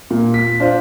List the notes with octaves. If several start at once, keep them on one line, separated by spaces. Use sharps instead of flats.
A#2
B6
D4 F4 C5